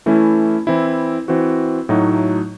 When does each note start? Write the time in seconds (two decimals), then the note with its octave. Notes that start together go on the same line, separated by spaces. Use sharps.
0.06 E3 A3 C#4 E4
0.67 E3 C4 E4
1.28 E3 C4 F#4
1.89 A2 F#3 A3 D#4 F#4